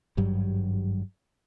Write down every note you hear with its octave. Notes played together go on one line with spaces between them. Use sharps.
G#1 G2 F#3 G3